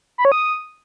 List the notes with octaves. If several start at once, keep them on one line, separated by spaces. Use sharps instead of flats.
B5
C#5
D#6